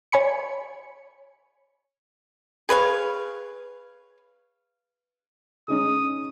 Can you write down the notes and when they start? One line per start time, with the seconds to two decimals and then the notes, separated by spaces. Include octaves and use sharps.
0.12 C#5 G#5 B5 C#7
2.69 G#4 B4 C#5 F5
5.68 C#4 D#4 G#4 D#6